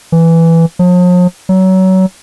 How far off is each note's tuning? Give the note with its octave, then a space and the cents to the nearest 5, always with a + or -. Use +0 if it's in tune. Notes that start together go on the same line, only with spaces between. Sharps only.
E3 +5
F3 +45
F#3 +25